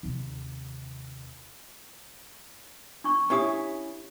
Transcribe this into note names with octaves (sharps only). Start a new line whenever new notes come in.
D#2 C3
D4 C#6
C#4 D4 E4 G4 D#6